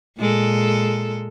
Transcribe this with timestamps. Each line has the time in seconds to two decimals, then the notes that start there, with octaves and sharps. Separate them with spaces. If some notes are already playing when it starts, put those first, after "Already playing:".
0.18 A#2 G#3 A4